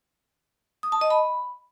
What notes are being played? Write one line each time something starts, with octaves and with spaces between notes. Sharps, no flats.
D#6
A5
D#5
B5